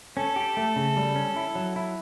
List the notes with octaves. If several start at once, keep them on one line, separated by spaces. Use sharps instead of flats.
C#4 A4
G4
A3
C#3
G3
C#4
E4
F#3
E4